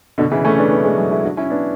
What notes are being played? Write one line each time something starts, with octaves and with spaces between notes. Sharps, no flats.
B2 D3
C#3 E3
A3 C#4
B3 D4
B3 D4
G#3 B3
F#3 A3
E4 G#4
D4 F#4
C#4 E4
B3 D4